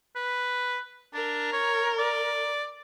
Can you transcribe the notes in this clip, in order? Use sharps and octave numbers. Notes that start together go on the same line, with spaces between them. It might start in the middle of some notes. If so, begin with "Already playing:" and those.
B4
D4 A#4
C#5
D5